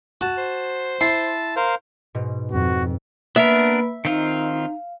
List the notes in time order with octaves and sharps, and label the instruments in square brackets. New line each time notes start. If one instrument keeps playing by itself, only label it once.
[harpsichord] F#4 A5
[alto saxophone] C5
[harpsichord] E4 [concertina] A5 [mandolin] C6
[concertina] A#4 C5 F5
[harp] G#2 B2
[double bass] F2 [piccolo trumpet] F#4
[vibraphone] A#3 B4 B5 [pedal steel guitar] B3 D4 A#4 [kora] E5
[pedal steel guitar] D#3 C4 F4 [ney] D#4 [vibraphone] F5